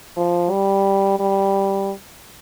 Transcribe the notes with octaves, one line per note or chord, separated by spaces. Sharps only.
F3
G3
G3